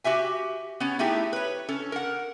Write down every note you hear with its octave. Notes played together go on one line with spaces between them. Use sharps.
F#4 G4 E5 G#5
B3 C#4
A3 D#4 E4 G4 G#4
B4 C#5
C#4 A4
A#4 F#5